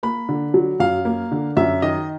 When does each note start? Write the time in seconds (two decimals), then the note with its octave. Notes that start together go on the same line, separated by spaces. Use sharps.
0.03 A#3 B5
0.29 D3
0.54 F#3
0.80 F#2 F5
1.05 A#3
1.32 D3
1.57 F#2 E5
1.82 D#3 D#5